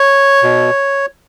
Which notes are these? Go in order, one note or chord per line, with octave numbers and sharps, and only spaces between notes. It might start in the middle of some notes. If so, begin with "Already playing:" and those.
Already playing: C#5
B2